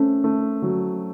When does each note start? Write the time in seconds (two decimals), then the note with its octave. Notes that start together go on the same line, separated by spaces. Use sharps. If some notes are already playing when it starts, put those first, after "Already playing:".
Already playing: A3 C4 C#4
0.24 A3
0.62 F#3